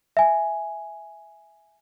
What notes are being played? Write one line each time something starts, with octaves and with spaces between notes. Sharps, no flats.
E5 G#5